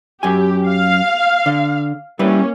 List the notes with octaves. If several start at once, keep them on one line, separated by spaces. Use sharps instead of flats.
F#2 G4 G#5
F5
D3
G3 A#3 C#4 E4 B4